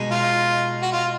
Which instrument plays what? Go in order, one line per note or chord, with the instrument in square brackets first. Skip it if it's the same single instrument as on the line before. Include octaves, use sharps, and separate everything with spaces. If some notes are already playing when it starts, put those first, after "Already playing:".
Already playing: [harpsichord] B2 G#3 D#4 G#4
[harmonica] F4
F#4
F4